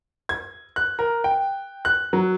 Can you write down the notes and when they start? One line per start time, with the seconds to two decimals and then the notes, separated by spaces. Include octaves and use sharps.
0.29 G#6
0.76 F#6
0.99 A#4
1.24 G5
1.85 F#6
2.13 F#3